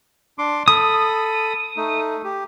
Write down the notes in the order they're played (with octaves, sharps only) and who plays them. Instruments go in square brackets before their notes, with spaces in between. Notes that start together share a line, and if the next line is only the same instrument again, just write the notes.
[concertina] D4 C6 D6
[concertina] A4 B5 [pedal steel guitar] D#6
[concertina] A3 D#4
G4